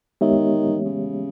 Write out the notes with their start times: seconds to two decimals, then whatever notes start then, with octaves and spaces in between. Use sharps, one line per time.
0.21 D#3 G#3 B3 G4 C#5 E5
0.85 C#3